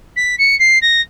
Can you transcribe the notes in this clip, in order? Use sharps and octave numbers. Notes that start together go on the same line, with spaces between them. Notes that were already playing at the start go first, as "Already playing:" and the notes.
B6
C#7
C7
A#6